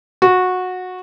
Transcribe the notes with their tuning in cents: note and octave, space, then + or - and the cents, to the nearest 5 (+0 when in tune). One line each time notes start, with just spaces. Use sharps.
F#4 -15